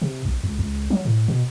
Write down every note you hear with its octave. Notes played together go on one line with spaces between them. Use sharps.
C3
B1
C#2
C#2
F#3
A2
B2